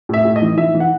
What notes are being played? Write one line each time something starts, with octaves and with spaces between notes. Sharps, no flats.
A2 E5
A2
D#5
E3
E3 E5
E3
F#5